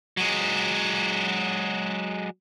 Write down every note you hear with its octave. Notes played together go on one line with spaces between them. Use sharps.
F#3 G#3